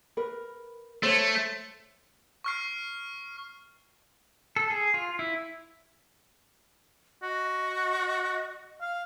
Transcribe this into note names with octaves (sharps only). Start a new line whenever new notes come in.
A#4 B4
A3 C5 C#5
C#6 F6 C7
A4
G#4
F4
E4
F#4 D#5
F5